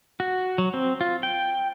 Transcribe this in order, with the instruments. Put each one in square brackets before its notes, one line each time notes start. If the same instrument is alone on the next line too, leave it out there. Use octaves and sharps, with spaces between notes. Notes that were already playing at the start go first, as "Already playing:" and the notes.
[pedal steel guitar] F#4
F#3
C4
F4
G5